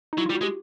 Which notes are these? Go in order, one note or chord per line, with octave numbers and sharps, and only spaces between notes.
D#4
F#3 E4
G3 F4
F#4
G#3 G4